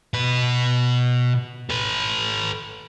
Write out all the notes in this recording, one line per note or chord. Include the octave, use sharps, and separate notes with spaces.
B2 B4
A4 B4